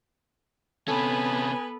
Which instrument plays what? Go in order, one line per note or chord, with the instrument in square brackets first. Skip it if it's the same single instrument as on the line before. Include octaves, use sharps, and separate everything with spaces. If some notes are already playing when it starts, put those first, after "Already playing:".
[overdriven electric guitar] C3 C#4 [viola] B3 B4 [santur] A4 [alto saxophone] G#5